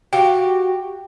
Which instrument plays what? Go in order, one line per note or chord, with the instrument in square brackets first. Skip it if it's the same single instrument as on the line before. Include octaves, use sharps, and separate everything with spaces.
[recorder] F#4 [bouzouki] G4 [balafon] F5 G5